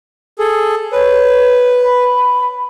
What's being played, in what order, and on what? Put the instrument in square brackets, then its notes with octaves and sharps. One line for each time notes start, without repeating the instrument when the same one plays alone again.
[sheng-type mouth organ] G#4 A4
[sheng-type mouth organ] B4 [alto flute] C#5
[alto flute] B5